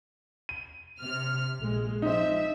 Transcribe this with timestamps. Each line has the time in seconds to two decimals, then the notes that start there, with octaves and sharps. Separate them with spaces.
0.49 D#7
0.99 C3 F6
1.58 A#1 G#3
2.02 F3 C4 D#4 E5